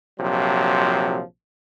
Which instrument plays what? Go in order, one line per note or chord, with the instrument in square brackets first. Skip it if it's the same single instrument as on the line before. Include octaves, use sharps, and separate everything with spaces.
[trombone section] A#1 C3 F3 F#3